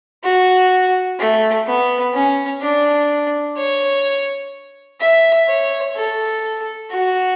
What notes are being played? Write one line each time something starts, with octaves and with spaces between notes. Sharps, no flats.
F#4
A3
B3
C#4
D4
C#5
E5
C#5
A4
F#4